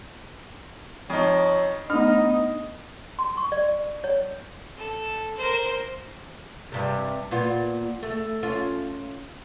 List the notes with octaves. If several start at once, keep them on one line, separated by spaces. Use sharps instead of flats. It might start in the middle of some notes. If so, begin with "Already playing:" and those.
F2 D#4 C#5
A3 B3 D4 D#4 D#5 F6
C6
C#6
D5
C#5
A4
A#4 C5
G2 C3
A#2 B3 F4
A3
C#4 F4